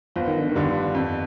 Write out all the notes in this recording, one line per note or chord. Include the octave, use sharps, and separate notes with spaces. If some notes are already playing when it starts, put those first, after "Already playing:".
G1 F3
D#3
D3
D#3
G2 D3 G3 D4
F2